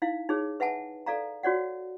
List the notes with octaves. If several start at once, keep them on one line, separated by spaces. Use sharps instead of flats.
D#4 E4 F5
D#4 G#4 C#5
B4 E5 F#5 G#5 A5
A4 D5 F5 A#5
F#4 C#5 D5 F#5